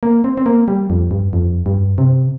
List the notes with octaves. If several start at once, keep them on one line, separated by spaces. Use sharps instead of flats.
A#3
C4
C4
A#3
G3
F2
G2
F2
G2
C3